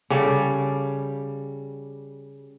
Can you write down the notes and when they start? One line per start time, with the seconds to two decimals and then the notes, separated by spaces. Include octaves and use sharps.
0.10 C#3 G3 A4 D5